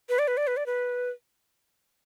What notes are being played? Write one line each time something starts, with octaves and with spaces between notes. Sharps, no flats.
B4
D5
B4
D5
B4
D5
B4